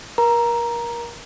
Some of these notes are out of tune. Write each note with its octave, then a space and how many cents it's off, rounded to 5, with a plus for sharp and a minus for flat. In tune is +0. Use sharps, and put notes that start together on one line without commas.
A#4 +30 A#5 +5